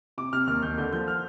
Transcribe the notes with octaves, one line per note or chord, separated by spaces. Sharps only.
C3 D6
C3 F6
D#2 F6
D#2 G6
D3 G6
F3 G6
F6